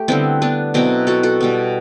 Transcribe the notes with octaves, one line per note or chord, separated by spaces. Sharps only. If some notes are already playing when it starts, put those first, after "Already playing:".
Already playing: A3 G4
D3 G3 B3 C4 E4
B3 D4
B2 F#3 B3 C4 E4
F#4 A4
F#4 A4
B2 G3 B3